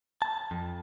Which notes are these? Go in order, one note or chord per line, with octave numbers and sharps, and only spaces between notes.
A5
F2